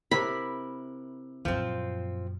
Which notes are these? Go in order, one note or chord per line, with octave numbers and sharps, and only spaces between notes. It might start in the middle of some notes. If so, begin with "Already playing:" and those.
C3 E4 A#4 B5
F#2 A#2 F3 C4